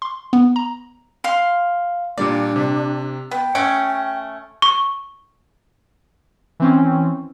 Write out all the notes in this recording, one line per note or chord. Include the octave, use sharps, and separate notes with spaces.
C6
B3
A#5
F5 C6
A#2 G3 A#3 D4 D5
C3
B3 G5
A3 C#4 F#5 G#6 C#7 D7
C#6
E3 C4 C#4